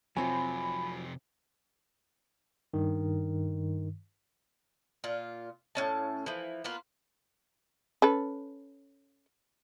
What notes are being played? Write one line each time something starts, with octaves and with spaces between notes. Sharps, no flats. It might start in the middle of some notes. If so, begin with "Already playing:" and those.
F2 C3 F#3 C4 F4 G#5 B5
G2 D#3
A#2 F4
A2 C#4 A5
E3 F3
A#3 B3 F4
C#4 A4 B4